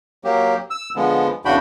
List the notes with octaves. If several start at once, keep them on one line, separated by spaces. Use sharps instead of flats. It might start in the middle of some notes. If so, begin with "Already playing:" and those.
F#3 A#3 G4
E6
D3 F3 G#3 B3
E2 C#3 D4 F#4 G5 B5